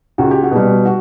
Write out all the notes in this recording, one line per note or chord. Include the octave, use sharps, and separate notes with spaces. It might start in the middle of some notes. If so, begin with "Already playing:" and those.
C#2 F#4
G4
F#4
B2 G3
F#4